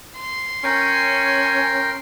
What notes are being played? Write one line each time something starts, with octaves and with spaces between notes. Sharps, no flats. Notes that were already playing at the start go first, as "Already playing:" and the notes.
C6
C#4 A#4 G5 G#5